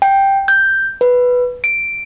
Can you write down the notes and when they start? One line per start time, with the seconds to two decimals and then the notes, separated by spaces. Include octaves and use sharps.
0.02 G5
0.48 G6
1.01 B4
1.64 D7